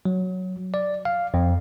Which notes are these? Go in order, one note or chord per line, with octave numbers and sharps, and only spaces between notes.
F#3
D5
F5
F2